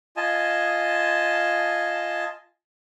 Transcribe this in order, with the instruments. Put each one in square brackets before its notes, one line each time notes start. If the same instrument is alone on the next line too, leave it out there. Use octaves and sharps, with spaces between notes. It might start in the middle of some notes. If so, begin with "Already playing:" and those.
[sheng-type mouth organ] F4 D#5 G#5 A5